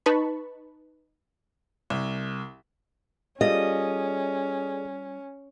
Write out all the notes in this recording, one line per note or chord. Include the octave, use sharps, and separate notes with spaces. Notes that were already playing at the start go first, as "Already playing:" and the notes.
D#4 B4 A5 B5 C#6
C2
G3 C#4 F4 G#4 A4 D5 D#5